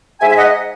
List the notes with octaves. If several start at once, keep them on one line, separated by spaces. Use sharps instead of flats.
G#2 E5 G#5
E5
D#5 F#5